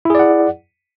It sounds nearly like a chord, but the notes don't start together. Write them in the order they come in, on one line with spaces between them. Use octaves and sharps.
E4 G#4 D5 F#5